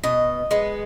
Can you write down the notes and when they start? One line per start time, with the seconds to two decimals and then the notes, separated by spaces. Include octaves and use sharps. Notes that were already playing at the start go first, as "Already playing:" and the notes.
0.03 B2 D#5
0.51 G#3 B3